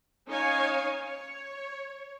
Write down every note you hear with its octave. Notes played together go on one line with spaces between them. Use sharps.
C#4 D#4 C#5 F5 G#5
C#5